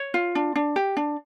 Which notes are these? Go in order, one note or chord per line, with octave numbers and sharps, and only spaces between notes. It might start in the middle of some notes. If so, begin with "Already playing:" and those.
Already playing: C#5
F4
D4
D4
G4
D4